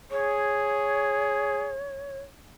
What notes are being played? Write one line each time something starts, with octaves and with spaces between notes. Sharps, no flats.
G#4 C#5